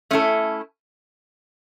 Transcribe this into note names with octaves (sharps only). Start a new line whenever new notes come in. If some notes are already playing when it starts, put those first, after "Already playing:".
A3 C#4 E4 A4